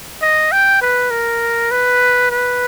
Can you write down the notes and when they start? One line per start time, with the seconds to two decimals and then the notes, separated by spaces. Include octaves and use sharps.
0.22 D#5
0.52 G5
0.81 B4
1.11 A#4
1.71 B4
2.31 B4